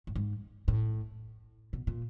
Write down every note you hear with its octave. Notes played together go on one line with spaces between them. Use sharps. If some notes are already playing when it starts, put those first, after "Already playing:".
A2
G#2
A2
B2
A#2